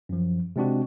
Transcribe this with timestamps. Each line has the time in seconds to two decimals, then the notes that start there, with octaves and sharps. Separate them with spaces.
0.09 F#2 F3
0.56 C3 G#3 C4 D4 F#4